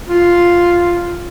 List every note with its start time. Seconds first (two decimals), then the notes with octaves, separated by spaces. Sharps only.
0.09 F4